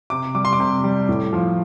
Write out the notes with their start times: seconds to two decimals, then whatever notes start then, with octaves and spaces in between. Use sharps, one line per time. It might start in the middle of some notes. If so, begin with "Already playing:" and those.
0.10 C3 D6
0.35 G3 D6
0.45 C6
0.53 D6
0.60 C3
0.84 G3
1.09 A2
1.33 F3